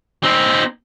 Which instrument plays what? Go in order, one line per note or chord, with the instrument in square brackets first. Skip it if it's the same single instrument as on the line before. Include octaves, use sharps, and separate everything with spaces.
[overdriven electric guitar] C4 D#4